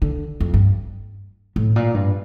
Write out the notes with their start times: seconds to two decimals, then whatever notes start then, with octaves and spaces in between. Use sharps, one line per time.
0.02 D3
0.40 F2
0.54 G2
1.56 A2
1.76 A#2
1.94 G2